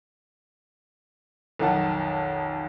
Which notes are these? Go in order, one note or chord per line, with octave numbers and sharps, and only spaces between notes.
B1 F2 D#3 F#5 A5